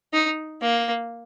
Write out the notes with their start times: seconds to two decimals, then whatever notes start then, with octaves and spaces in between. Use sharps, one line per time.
0.13 D#4
0.61 A#3